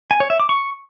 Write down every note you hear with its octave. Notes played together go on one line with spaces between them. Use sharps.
G#5
C#5
E5
D6
C#6